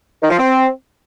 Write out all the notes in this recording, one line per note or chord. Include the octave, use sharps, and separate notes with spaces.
D#3
F3
C4